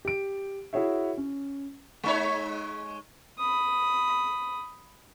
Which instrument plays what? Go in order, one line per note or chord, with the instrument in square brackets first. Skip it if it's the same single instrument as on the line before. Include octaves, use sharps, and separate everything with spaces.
[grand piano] G4 D7
E4 F#4 G#4 C#5 E5
C#4
[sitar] G#3 D#4 C#5
[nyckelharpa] B5 D#6